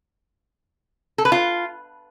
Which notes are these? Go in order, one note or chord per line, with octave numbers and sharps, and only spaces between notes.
A4
B4
F4